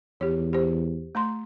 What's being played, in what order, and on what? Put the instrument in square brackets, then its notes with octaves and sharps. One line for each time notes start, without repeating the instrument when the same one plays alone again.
[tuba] E2 [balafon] G4 C#5
[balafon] G4 C5
A3 A#5 C6